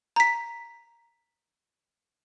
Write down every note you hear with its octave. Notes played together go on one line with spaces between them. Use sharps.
A#5 B6